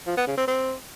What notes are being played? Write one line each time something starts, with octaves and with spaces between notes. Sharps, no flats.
F3
B3
C#3
C4
C4